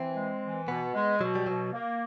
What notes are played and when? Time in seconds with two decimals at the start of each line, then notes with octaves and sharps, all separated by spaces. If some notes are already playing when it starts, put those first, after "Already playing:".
Already playing: E3 C4
0.16 G#3
0.43 E3
0.68 B2 B3
0.94 G#3
1.21 B2 F#3
1.35 G3
1.47 B2 F#3
1.73 A#3